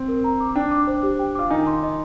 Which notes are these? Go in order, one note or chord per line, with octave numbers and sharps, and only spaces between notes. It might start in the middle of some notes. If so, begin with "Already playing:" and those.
Already playing: C4
A#4
A#5
D6
D4 G5
D6
C5
G4
G5
F4 D6
D#3 D#4 G#5
C6
D#5